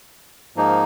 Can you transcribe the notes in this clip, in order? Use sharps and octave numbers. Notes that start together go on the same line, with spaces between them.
G#2 F3 A#3 D#4